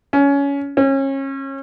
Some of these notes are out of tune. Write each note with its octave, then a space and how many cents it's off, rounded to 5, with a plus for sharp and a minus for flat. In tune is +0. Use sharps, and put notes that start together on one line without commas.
C#4 +20
C#4 -30